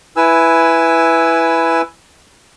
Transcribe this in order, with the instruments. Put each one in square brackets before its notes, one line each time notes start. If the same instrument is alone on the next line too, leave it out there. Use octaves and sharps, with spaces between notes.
[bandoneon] E4 B4 G#5 E6